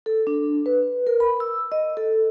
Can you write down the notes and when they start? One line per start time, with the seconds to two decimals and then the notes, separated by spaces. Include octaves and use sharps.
0.06 A4
0.27 D4
0.66 B4
1.07 A#4
1.20 B5
1.40 E6
1.72 D#5
1.97 A4